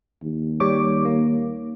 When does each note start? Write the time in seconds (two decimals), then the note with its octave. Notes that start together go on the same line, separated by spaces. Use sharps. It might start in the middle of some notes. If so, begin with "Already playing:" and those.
0.23 D#2
0.60 G3 C#5 D6
1.05 A#3